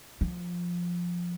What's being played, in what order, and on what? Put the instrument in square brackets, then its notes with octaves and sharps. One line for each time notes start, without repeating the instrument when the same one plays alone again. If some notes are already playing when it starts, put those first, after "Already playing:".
[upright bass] F3